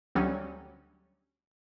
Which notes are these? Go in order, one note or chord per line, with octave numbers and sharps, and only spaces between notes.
D2 F#3 G3 C#4